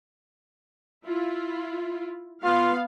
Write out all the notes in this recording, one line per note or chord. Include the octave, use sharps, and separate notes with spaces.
E4 F4
B3 F4 F5